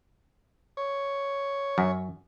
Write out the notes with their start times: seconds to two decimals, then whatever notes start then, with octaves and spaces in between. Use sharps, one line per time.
0.77 C#5
1.78 F#2